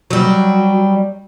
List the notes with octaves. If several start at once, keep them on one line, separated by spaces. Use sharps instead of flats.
F#3 G3